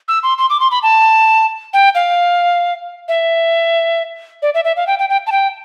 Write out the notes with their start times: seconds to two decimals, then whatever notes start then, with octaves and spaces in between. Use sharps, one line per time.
0.08 E6
0.23 C6
0.38 C6
0.50 D6
0.60 C6
0.71 B5
0.83 A5
1.73 G5
1.95 F5
3.08 E5
4.42 D5
4.54 E5
4.64 E5
4.76 F5
4.87 G5
4.99 G5
5.09 G5
5.27 A5
5.32 G5